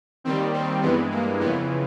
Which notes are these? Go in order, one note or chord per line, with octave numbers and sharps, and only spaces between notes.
D#2 D#3 G3 C4
C4
G2 E3 G#3 B3
A#3
F2 C#3 E3 B3